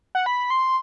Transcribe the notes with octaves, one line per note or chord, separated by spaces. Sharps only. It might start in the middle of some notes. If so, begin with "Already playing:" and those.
F#5
B5
C6